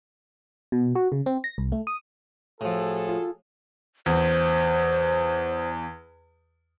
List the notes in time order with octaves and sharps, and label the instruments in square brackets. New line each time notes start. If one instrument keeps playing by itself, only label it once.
[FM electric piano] B2
F#4
C#3
C4
A#6
C2
A3
D#6
[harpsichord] A2 F3 [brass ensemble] F#4 G#4 A4
[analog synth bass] F4
[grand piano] E2 [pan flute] C5